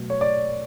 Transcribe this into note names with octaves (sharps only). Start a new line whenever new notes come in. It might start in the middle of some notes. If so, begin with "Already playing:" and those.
Already playing: B2 F#3 A3
C#5
D5